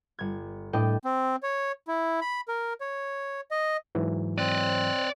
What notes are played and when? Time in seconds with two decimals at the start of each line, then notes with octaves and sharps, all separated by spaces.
0.19 G1 G#6
0.73 A2 D4 D#5 G5
1.05 C4
1.43 C#5
1.88 E4
2.21 B5
2.48 A#4
2.81 C#5
3.51 D#5
3.95 G#2 E3 F#3
4.38 C4 D5 D#5 F#6